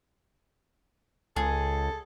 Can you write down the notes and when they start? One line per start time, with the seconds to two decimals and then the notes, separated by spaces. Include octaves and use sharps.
1.36 C#2 G#4 A4